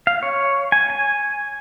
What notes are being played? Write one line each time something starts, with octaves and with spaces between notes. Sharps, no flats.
F5
C#5
G#5
G#5